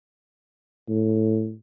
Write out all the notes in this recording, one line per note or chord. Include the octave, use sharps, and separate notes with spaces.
A2